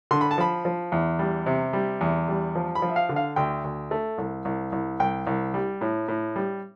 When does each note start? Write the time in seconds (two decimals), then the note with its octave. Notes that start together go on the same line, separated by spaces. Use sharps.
0.11 D3 C6
0.21 B5
0.31 A5
0.38 F3 B5
0.65 F3
0.92 E2
1.19 G3
1.46 C3
1.73 G3
2.01 E2
2.28 G3
2.55 F3
2.75 B5
2.82 F3
2.89 E5
2.96 F5
3.09 D3
3.16 F5
3.36 D2 G5
3.64 D2
3.91 A3
4.18 C2
4.45 C2
4.72 C2
5.00 C2 G5
5.27 C2
5.54 G3
5.81 A2
6.08 A2
6.36 G3